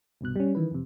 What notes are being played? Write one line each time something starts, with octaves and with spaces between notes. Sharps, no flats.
C2 G2 B2 F#6
G3 C#4
D#3 E3 B4
F2 C3